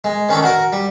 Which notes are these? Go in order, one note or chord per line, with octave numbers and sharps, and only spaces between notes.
G#3
D#3 C#4 D4 A4
F#4 A#4
G3